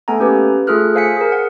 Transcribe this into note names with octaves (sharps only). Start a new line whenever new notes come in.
A3 B3 A4 G#5 A#5
A#3 C#4 G4 B4
A3 F4 G#4 A4 F6 F#6
C5 F5 G#5 B6 C#7
G#4 A#4
F#5